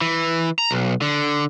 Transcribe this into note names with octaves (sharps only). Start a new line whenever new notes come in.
E3
A#5
B1
D3